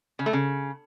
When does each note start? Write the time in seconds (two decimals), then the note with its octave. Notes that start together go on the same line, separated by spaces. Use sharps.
0.19 C#3
0.26 A3
0.33 C#3